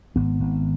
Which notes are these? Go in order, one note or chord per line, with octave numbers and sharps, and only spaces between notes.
G#1 B3
G#1